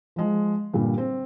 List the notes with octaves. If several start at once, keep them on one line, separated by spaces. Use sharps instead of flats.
F3 G#3
G2 A#2 D3 G3
C4